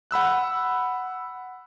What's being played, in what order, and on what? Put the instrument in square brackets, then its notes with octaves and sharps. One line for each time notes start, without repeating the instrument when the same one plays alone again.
[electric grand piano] F#5 B5 E6 F#6